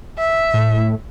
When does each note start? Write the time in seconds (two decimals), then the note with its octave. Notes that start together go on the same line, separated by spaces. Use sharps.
0.18 E5
0.54 A2